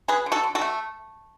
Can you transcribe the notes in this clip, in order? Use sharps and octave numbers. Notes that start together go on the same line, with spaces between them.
F#3 G#4 B4
D3
F#4 A4
D3
F#4 A4
A3